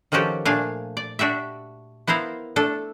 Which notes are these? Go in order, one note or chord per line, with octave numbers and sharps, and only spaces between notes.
D#3 F3 C#4 F#4 G4 A4
A#2 A3 D4 F5 G#5
D5
D4 F#4 G4 E5
B3 E4 A#4 C5 F5
A3 D4 A4